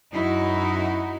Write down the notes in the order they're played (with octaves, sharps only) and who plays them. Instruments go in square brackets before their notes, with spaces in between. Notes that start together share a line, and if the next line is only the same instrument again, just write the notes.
[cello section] F#2 D#4 E4 F#4